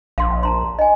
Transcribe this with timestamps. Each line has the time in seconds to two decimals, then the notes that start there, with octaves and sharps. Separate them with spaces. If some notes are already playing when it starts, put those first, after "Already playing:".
0.18 A#1 F5 C6
0.43 A5 A#5 C6
0.79 D#5 G#5